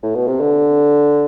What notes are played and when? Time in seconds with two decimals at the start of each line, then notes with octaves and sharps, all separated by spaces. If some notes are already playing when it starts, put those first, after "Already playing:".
0.03 A2
0.15 B2
0.27 C3
0.40 D3